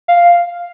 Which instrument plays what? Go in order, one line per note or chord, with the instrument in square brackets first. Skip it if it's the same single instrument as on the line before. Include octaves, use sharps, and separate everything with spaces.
[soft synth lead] F5